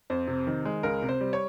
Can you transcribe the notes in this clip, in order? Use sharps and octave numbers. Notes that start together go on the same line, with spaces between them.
F2 C5
C3
D#3
G#3
C#2 A#4
C3
C5
G3
C#5